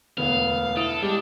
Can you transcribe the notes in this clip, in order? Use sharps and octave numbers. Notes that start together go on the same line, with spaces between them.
E1 D2 B3 F5
E4 A4 D#6 D7
G3 G#3 D4 G4